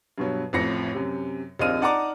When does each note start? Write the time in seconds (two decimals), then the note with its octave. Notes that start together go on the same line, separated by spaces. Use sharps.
0.18 G2 B2 F#3
0.53 A1 F2 A2 A#6 C#7
0.94 F#2 C3
1.59 A#1 D#2 C4 D#5 F6 D#7
1.81 D#4 D5 F#5 A5 A#5 D6